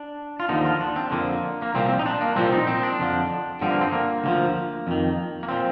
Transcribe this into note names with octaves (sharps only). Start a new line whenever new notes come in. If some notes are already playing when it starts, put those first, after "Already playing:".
Already playing: D4
F4
D#2 D3 F3 D#4
F4
D4
C4
F2 D3 F3 A#3
A#3
C2 A#2 F3 C4
C4
D#4
D4
A#3
C2 A#2 F3 C4
D#4
C4
D4
F2 D3 F3
G2 D3 F3 C4
A#3
C4
A#3
D2 D3 F3
F2 D#3
A#3
A#2 F3 C4